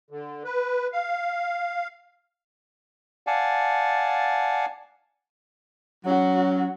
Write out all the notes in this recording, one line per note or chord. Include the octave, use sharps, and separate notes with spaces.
D3
B4
F5
D5 F5 F#5 G#5 A5
F#3 C#4 F#4